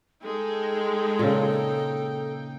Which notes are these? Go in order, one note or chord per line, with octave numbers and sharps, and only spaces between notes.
G#3 D#4 A4 G5
A#2 C#3